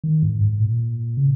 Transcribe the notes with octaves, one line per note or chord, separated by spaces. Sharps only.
D#3
G#2
G#2
A#2
C#3